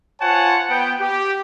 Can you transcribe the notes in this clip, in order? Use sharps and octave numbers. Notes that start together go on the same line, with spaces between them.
F4 C5 C#5 F#5 G#5 A5
B3 G5
G4